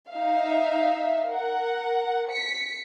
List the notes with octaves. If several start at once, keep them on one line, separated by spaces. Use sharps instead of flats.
D#4 E5 F5
A#4 F#5
B6 C#7